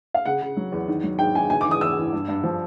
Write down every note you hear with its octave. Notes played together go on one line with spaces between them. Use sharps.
F5
C#3 F#5
C#3
F#3
E2
D#3
F#3
G#2 G5
D#3 G#5
C#3 G#5
D6
E3
D#6
E2 E6
E3
G2
G2
F3